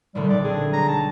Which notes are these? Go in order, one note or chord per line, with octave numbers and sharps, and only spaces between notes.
D#1 B1 D3 G3
G3 D5
C4 D4 G#4
B1 A#5
A5